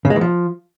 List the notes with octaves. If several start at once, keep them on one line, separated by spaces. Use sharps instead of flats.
C#3
G#3
E3
F3